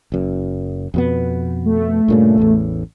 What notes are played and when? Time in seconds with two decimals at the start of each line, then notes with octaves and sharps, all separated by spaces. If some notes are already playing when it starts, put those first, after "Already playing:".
0.12 F#1 F#2
0.94 F2 B2 B3
1.66 A3
2.08 G2 A#2 C#3
2.38 A1 E2 A2